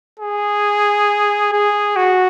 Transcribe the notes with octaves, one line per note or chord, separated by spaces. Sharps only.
G#4
G#4
F#4